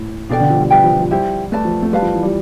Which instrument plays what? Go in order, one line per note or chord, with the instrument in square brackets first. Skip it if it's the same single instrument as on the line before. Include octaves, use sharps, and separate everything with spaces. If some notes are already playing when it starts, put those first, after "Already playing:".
Already playing: [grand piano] A2
[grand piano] B2 [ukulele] D4 A4 D5 G5
[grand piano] D3
F3
G3
[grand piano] G3 [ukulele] B4 E5 G5
[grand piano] F3
F3
[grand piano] G3 [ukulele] E4 G4 C5
[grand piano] A3 [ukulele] B4 D5 A5
[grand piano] F3
A3
[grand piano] G3 [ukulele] F4 B4 F5 A5
[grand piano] F3
E3
G3